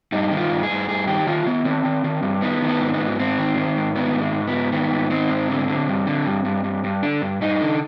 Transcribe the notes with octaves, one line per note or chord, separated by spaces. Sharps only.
G2 D#4
D#3
F4
G2
G#4
G2
G2 G#4
D#3 G4
D#3 F4
D#3 B3
D#3 C4
D#3
D#3
G2
D#3 B3
D#3
B3
G#2
B3
G#2
G#2 C4
D#3
D#3
G#2
D#3 B3
G#2
G#3
G#2
B3
G#2
D#3 B3
G#2
D#3 C4
G#2
D3
D3
G2
D3
G2
G2
G2
G2
D3 D4
G2
G2 D#4
D3